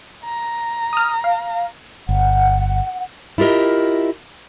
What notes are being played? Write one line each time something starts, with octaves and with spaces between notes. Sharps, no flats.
A#5
D#6 F6
F5
G1 F#5
E4 F4 G4 A#4 D#5